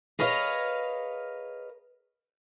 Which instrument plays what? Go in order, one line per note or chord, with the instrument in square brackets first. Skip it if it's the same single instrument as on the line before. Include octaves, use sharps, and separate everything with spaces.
[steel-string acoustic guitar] G#4 A#4 B4 C#5 D#5 F5